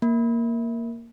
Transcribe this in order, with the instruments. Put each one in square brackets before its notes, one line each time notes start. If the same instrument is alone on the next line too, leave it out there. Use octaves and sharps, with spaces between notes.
[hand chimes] A#3